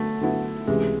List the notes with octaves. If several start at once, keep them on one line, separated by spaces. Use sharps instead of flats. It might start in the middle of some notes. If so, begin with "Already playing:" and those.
Already playing: D3 F#3 A3 B3
D3 F#3 B3 E4
C#2 C3 E3 G#3